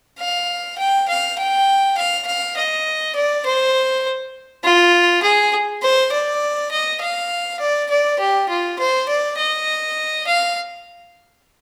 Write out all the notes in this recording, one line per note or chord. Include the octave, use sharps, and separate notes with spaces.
F5
G5
F5
G5
F5
F5
D#5
D5
C5
F4
G#4
C5
D5
D#5
F5
D5
D5
G4
F4
C5
D5
D#5
F5